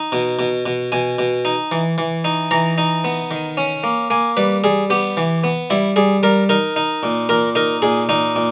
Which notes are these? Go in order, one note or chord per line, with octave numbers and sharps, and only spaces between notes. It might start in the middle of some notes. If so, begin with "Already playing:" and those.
Already playing: D#4
B2
B2
B2
B2 G#5
B2
D#4
E3
E3
D#4
E3 A#5
D#4
B3
D#3
C#4
A#3
A#3 G#5
G3 B4
G3 G#4
B3 G4
E3
B3
G3 E4
G3 G#4
G3 A#4
D#4 A#4
D#4
A#2
A#2 A#4
D#4 A#4
A#2 G#4
A#2 D#4
A#2